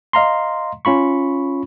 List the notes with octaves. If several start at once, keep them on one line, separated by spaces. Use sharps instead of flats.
D#5 F5 A#5 C6
C#4 F4 B5 C#6